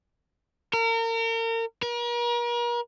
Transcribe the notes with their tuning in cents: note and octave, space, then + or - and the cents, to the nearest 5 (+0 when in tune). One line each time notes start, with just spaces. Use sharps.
A#4 -35
A#4 +40